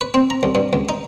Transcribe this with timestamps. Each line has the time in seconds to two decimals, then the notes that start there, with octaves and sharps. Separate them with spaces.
0.01 B4
0.14 C4
0.30 A#5
0.43 C2
0.55 G2
0.73 C#2
0.89 D#4